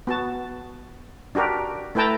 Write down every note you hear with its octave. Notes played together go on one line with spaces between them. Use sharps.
B3 F#4 A5
D4 F#4 G4 A#4
A3 E4 B4 G5 A5 A#5